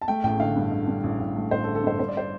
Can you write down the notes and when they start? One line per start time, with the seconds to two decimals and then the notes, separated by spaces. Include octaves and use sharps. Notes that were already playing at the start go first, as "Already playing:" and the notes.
0.02 A5
0.08 A3 G5
0.24 A1 G5
0.40 D3 F5
0.56 G2
0.72 D3
0.88 G2
1.04 A1
1.20 A1
1.36 A3
1.51 A1 C5
1.64 A4
1.68 D3
1.75 A4
1.84 G2 C5
1.99 G2 C5
2.08 D5
2.17 C5